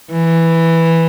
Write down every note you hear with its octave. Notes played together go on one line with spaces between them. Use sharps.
E3